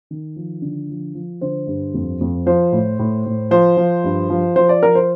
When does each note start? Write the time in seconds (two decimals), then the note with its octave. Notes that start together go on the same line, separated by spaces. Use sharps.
0.11 D#3
0.36 F3
0.62 D3
0.89 F3
1.14 F3
1.41 D3 C5
1.67 G2
1.94 F2
2.21 F2
2.46 F3 C5
2.72 A2
2.99 A2
3.26 A2
3.51 F3 C5
3.77 F3
4.04 G2
4.30 F3
4.56 F3 C5
4.69 D5
4.83 F3 A#4
4.95 C5